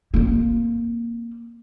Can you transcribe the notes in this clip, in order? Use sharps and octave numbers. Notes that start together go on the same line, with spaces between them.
A#3 C4